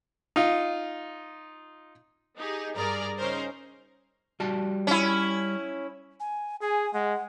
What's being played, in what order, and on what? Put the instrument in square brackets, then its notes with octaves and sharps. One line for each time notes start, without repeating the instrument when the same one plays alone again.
[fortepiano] D#4 F4
[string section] D#4 G4 G#4
G2 G#4 A#4 D5 A#5
C#3 C#4 D#4 A#4 C5
[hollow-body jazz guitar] G3 F#4 A5
[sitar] C#4 E4
[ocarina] G#5
[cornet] G#4 [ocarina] G#5
[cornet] G#3 [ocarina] F#5